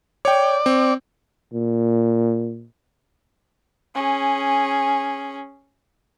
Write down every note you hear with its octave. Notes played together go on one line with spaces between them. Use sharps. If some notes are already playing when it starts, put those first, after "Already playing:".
C#5 D5 G5
C4
A#2
C#4 G#4